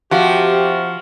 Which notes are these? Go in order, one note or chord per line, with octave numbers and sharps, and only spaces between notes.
C3 F3 F#4 G4 F#5